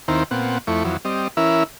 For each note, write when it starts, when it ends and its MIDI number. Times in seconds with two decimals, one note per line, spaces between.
0.08 0.24 39
0.08 0.24 51
0.08 0.24 60
0.08 0.24 64
0.08 0.24 72
0.08 0.24 82
0.31 0.58 46
0.31 0.58 59
0.31 0.58 60
0.31 0.58 78
0.67 0.84 41
0.67 0.84 57
0.67 0.84 64
0.67 0.84 85
0.84 0.97 41
0.84 0.97 52
0.84 0.97 54
1.05 1.28 55
1.05 1.28 60
1.05 1.28 75
1.37 1.63 52
1.37 1.63 61
1.37 1.63 64
1.37 1.63 70
1.37 1.63 76